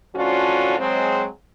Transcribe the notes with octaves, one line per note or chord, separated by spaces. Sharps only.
A2 F3 C#4 D4 F4 F#4
F#3 G#3 C4